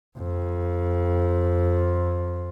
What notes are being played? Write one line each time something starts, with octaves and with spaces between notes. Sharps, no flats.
F2